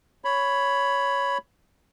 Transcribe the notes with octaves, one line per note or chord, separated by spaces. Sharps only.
C#5 B5